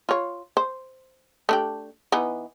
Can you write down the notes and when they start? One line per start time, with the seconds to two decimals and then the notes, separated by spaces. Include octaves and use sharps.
0.09 F4 C#5
0.57 C5
1.49 A3 D4 G4
2.12 E3 B3 D#4